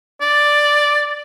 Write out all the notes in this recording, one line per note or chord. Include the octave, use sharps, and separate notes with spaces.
D5